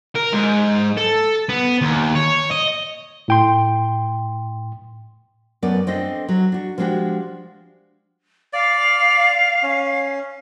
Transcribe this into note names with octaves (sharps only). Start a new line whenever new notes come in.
A#4
G#2
A4
B3
D#2
C#5
D#5
A2 G5 C6
F#2 A3 B3 D5
C4 D4 A4 D#5
F#3
D4 F#4
F3 G#3 B3 D4 F#4 G4
D5 F5
C#4